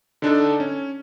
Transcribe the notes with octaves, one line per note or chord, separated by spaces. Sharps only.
D3 D4 D#4 A4
C#4